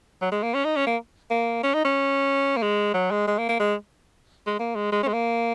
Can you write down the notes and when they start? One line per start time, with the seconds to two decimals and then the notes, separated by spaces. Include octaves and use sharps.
0.22 F#3
0.32 G#3
0.43 A#3
0.54 C#4
0.65 D#4
0.76 C#4
0.87 A#3
1.31 A#3
1.63 C#4
1.74 D#4
1.85 C#4
2.57 A#3
2.62 G#3
2.94 F#3
3.11 G#3
3.27 G#3
3.38 A#3
3.49 A#3
3.60 G#3
4.47 G#3
4.59 A#3
4.75 G#3
4.92 G#3
5.03 C#4
5.08 G#3
5.13 A#3